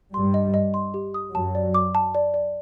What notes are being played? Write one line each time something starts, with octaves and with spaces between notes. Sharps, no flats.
G2 G3 C6
D#5
D#5
C6
G4
D#6
F#2 F#3 A5
D5
D6
A5
D5
D5